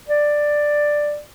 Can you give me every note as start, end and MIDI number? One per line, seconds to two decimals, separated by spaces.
0.08 1.18 74